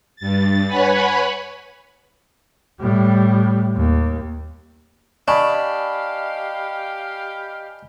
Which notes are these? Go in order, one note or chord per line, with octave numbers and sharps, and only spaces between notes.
G2 A6
B4 C#5 F#5 G#5 B5
A2 G3
D#2
D4 G4 D#5 F5 G#5 B5 C#6